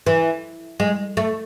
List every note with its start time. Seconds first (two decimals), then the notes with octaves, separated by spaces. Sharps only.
0.06 E3
0.80 G#3
1.17 A3